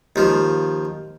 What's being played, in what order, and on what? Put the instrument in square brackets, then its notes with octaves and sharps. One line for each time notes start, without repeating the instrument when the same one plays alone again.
[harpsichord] D#2 F3